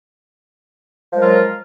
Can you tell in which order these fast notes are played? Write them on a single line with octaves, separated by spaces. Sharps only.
F3 G#3 A#4 F#3 F4